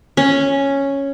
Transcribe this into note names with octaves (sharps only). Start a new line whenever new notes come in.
C#4